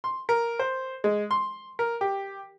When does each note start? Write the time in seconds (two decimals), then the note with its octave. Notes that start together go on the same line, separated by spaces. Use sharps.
0.04 C6
0.29 A#4
0.59 C5
1.04 G#3
1.31 C6
1.79 A#4
2.01 G4